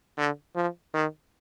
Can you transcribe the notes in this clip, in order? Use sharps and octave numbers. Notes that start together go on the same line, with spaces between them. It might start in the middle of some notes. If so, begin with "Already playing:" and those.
D3
F3
D#3